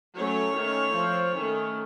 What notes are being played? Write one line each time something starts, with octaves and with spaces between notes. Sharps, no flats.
F#3 A3 C#4 C#5
D#3 A3 C#4
F3 C4
D#3 A3 C#4